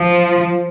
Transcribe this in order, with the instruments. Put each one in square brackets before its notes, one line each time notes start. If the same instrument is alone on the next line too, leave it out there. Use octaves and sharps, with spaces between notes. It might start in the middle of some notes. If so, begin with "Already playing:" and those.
Already playing: [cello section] F3